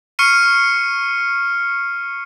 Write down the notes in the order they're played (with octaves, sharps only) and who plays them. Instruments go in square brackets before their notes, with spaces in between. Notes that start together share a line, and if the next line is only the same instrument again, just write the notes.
[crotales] C#6 F6 C7 C#7 D#7